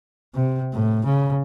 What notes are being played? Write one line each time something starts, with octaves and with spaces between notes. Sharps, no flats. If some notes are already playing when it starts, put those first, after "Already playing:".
C3
A2
C#3